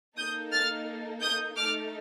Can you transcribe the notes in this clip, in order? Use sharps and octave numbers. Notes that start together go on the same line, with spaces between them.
A#3 D#4 A4 D#6 G6
F6 A6
D#6 G6
A3 D#4 A4 D6 F6